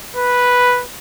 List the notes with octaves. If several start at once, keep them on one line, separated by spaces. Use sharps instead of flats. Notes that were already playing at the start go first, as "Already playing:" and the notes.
B4